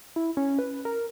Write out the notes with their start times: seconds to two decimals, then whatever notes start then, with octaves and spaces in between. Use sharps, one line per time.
0.16 E4
0.37 C#4
0.59 B4
0.85 A#4